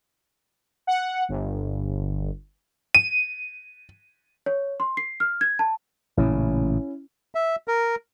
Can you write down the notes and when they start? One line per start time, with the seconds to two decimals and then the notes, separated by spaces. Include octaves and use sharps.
0.87 F#5
1.29 G1
2.95 D#7
4.46 C#5
4.80 C6
4.97 C7
5.20 F6
5.41 G#6
5.59 A5
6.17 A1 A#2 C#3 C#4 E4
7.35 E5
7.68 A#4